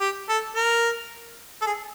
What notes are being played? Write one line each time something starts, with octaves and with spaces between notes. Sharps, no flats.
G4
A4
A#4
A4
G#4